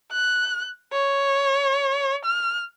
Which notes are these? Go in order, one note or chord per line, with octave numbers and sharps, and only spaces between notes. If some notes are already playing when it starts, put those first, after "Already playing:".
F#6
C#5
F6